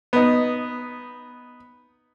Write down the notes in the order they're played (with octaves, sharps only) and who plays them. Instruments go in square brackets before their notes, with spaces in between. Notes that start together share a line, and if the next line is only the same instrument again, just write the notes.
[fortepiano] B3 D#4